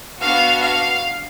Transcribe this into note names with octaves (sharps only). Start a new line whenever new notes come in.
B3 D4 F#4 F5
F5